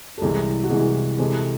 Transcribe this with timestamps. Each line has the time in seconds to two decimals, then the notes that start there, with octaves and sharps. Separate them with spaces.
0.18 A4
0.21 C2 C3 E3 G#3 G#4
0.63 F#4
0.70 C2 C3 E3 G#3 G#4
1.18 C3 E3 G#3 C4 A4
1.35 A4